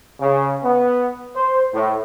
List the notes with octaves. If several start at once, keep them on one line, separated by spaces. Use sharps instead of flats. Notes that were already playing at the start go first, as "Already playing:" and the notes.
C#3
B3
C5
A2